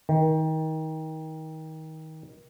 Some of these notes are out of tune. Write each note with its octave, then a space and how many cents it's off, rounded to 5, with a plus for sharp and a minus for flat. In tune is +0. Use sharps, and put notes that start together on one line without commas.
D#3 +25